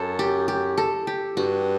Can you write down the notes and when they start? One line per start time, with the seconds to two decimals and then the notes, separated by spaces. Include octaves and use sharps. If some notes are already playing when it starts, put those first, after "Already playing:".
Already playing: F#2 A4
0.19 G4
0.48 G4
0.78 A4
1.07 G4
1.37 G2 F#4